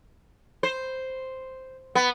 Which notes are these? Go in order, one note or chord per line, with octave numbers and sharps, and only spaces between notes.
C5
B3